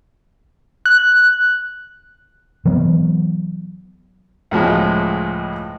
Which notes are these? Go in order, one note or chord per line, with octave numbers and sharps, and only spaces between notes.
F#6
E3 F#3 B3
C#2 A2 F3 G#3